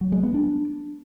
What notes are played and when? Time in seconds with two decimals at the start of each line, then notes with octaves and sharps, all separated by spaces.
0.01 F#3
0.12 G#3
0.23 B3
0.34 D4